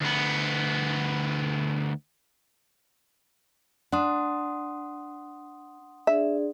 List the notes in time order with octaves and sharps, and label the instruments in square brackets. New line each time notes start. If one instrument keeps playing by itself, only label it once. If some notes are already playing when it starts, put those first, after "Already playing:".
[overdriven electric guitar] D2 B3
[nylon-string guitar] D4 [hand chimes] F#5 C6 D#6
[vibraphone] D4 G#4 D5 [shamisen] E5